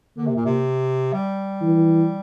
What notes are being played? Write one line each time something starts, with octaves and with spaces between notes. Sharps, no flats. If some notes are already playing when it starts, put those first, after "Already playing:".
D3 A#3
C3
A#2
C3
G3
E3